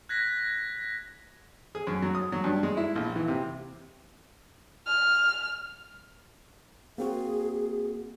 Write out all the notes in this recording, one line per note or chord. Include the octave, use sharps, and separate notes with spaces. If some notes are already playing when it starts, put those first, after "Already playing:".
F#6 G#6 A#6 B6
G#4
F#2
F#3
D#6
F#3
G2
G#3
E4
A#1
E3
C3
F6
A#3 C4 F#4 G#4